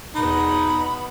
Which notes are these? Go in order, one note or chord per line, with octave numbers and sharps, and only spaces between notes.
E2 B2 B3 D#4 B5